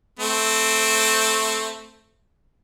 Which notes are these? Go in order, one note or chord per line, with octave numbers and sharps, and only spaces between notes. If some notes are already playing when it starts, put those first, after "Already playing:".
A3 C4